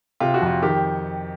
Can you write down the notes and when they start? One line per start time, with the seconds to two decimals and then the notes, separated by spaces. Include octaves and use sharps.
0.20 C3 F4
0.34 F#4
0.42 F2 F4
0.62 D#3 G4